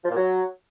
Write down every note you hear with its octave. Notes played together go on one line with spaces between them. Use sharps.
F3
A#2
F#3